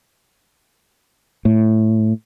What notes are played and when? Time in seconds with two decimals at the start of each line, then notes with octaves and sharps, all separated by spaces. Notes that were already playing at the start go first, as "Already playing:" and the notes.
1.45 A2